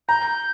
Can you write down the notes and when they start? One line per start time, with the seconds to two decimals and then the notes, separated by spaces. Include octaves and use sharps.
0.08 A#5 G6